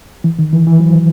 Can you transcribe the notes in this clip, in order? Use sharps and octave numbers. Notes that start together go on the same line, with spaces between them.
E3
D#3
E3
E3
F#3